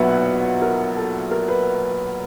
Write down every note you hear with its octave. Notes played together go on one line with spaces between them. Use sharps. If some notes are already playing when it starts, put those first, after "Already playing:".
Already playing: B1 A#2 F#3 B3 B4 E5 F#5
A#4
A4
A#4
B4